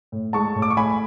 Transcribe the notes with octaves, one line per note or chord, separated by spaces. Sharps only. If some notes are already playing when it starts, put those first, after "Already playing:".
A2
G#3 A5 C#6
A2
D6
C#6
A2 G#5 B5